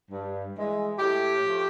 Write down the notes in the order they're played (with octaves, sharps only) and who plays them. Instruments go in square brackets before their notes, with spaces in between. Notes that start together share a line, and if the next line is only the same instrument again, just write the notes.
[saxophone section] G2
E3 G#3
A2 G4
F3 A3